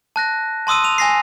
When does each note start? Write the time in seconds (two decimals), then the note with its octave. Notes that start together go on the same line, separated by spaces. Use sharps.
0.16 A5 F#6 A#6
0.67 A5 C6 D#6 E6 D#7
0.84 D#7 F7
0.98 G#5 A#6 C7